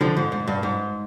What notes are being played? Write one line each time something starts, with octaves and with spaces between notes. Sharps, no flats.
D3 F3
G#2
G#2
G2
G#2